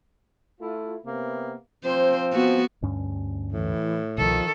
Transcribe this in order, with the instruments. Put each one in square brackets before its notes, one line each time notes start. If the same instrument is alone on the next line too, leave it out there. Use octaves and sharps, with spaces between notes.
[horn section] A3 E4 F4
C3 A#3 B3
[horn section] F3 C4 [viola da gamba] C5
[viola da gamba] B3 F#4
[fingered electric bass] D2 G2 C#4
[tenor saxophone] A2 [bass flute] E3
[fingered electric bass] C2 B2 [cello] D#3 A4 [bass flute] F3